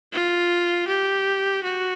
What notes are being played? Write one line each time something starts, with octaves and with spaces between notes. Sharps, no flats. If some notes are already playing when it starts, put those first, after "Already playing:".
F4
G4
F#4